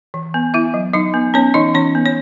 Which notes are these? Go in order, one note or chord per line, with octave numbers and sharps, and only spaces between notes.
E3
B3
B3 E4 E5
F#3
F#3 D#4 D#5
B3
B3 C#4 C#5
E3 D#4 D#5
E3 C#4 C#5
B3
C#5